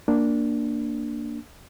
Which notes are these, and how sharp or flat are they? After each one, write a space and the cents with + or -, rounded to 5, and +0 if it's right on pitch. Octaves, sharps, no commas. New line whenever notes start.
A#3 +0 D4 +0